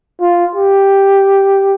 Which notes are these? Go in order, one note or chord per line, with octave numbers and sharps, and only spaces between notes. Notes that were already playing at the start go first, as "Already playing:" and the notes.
F4
G4